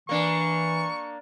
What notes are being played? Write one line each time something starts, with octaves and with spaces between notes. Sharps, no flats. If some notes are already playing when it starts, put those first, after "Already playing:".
E3 A#3 D4 C#6